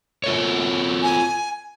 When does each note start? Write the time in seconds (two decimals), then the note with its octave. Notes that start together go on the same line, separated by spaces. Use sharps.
0.24 F4 A4 C#5
1.03 G#5